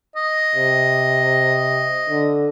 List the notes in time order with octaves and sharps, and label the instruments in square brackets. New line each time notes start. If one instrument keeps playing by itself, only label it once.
[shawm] D#5
[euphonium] C3
D3